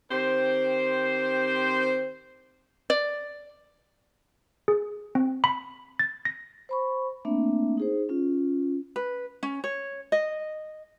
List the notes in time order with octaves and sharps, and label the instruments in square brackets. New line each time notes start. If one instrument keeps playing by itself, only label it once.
[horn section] D#3 C4 G4 C5
[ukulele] D5
[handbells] G#4
C4
B5
A6
A#6
[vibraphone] C5 B5 C#6
A3 A#3 C4 D4 E5
D#4 G#4 C5
C#4 F4
[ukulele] B4
C#4
C#5
D#5